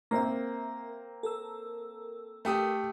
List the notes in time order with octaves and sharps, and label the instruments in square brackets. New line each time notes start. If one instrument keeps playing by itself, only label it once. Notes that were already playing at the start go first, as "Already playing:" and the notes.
[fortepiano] A#3 C4 [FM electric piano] A#4 E5
[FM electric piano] A4 A#4 E6
[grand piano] A3 G4 D#6